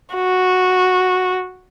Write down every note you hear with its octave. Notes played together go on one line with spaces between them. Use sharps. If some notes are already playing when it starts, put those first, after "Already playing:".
F#4